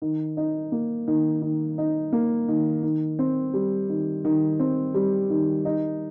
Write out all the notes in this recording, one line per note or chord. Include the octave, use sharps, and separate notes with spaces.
D#3
D#4
A#3
D#3
D#3
D#4
A#3
D#3
D#3
C4
G3
D#3
D#3
C4
G3
D#3
D#4